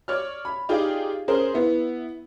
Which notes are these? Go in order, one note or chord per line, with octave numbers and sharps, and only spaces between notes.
C#5 D5 F6
B5
D#4 F4 G4 G#4 D5
C#4 G#4 A#4 C5
B3 E4